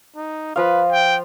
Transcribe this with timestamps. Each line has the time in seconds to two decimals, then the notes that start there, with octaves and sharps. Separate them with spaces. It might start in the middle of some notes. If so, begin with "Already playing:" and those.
0.16 D#4
0.56 F3 B4 F5
0.91 G5